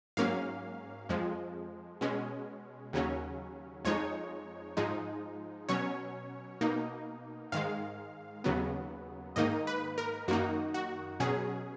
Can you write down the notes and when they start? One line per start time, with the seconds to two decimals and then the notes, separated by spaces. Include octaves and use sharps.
0.17 G#2 F#3 A#3 C#4 F5
1.09 F2 F3 G#3
2.01 B2 G#3 C#4
2.93 D#2 C#3 F#3 C#4
3.85 F2 F3 G#3 D#4 C#5
4.77 G#2 F3 G#3 D#4
5.69 B2 F#3 C#4 C#5
6.61 B2 A#3 D#4
7.52 G#2 D#3 G#3 F5
8.44 D#2 C#3 F#3 B3
9.36 G#2 D#3 A#3 D#4 D#5
9.67 B4
9.98 A#4
10.28 F#2 D#3 A#3 D#4 F#4
10.74 F#4
11.20 B2 F#3 C#4 G#4